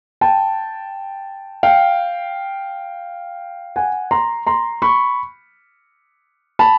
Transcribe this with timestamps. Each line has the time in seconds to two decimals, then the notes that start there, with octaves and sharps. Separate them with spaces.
0.21 G5 A5
1.63 F5 G5
3.76 F#5 G#5
4.11 A#5 C6
4.47 A#5 C6
4.82 B5 C#6
6.59 A5 B5